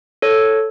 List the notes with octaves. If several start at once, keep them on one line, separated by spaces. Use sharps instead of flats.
A4 C#5